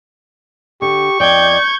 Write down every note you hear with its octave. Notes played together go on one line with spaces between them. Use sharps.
D3 G4 C#6
F2 D5 D#5 G5 G6 G#6